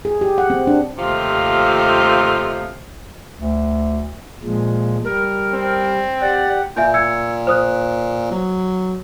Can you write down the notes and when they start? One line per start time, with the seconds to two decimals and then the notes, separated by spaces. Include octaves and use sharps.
0.05 G#4
0.21 G4
0.38 F#5
0.50 C4
0.67 D4
0.98 D#2 C3 F3 A3 F4
3.37 D2
4.43 A#2 F3 G#3
5.04 G3 A#4
5.54 C4
6.21 G4 D5 F#5
6.76 A#2 E5 G#5 G6
6.94 E6 G#6 C#7
7.47 C5 D#6 F#6
8.31 F#3